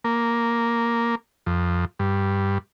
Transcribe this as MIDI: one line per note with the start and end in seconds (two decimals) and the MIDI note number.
0.04 1.15 58
1.46 1.85 41
1.99 2.58 43